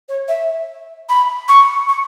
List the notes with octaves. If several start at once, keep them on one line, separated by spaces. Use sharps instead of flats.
C#5
E5
B5
C#6
C#6